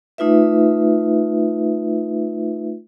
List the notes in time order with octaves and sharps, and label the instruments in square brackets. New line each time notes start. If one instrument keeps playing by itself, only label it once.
[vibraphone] A3 D#4 F4 B4 E5